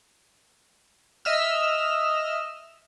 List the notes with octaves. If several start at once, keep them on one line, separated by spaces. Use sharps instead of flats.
D#5 E5 E6 F6